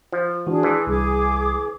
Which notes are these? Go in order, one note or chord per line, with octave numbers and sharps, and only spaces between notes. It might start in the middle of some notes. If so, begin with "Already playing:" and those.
F3
E3 G#3 D4 F#4 G#4
E3 C6
C2 G#3 G#4 D6